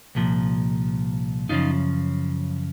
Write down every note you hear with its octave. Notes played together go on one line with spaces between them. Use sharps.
C2 A#2 F3
F#2 C#3 F3 D#4 F4